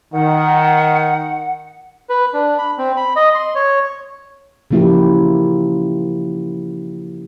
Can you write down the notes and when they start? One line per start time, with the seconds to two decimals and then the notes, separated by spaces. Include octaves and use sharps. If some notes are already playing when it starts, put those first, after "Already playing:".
0.13 D#3 F#5
2.09 B4
2.33 D4
2.58 B5
2.78 C4
2.96 B5
3.16 D#5
3.35 C6
3.55 C#5
4.71 C#3 F3 A#3 E4 F4 G4